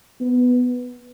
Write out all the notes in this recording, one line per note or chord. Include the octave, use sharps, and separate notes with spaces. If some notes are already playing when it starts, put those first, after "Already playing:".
B3